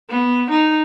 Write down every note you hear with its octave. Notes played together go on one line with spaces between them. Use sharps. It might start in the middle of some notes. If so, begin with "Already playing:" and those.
B3
D#4